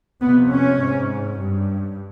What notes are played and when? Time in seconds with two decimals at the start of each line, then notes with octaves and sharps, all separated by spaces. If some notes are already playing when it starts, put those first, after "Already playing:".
0.22 F2 C3 B3
0.51 C#4
0.79 G#2
1.38 G2